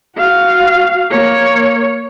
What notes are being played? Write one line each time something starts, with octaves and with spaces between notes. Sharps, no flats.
F#4 F5
A#3 C#5